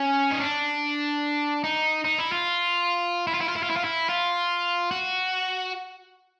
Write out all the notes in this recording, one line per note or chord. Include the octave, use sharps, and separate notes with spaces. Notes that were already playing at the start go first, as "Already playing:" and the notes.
Already playing: C#4
D#4
D4
D#4
D#4
E4
F4
E4
F4
E4
F4
E4
F4
E4
F4
E4
F4
F#4